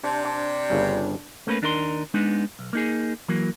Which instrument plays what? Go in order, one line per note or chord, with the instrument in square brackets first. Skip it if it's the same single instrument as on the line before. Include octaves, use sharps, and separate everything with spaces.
[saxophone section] C3 [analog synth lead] D4
[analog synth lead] D4
[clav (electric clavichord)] G1 C#3 G3
[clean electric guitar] A3 A#3 C#4 A4 B4
D#2 D4 D#4 A#4 B4 C6
G#3 B3 D4 D#4
B1
A#3 D#4 G#4
E3 F#3 A#3